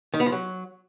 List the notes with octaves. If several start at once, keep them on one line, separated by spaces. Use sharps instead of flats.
D#3
B3
F3
F#3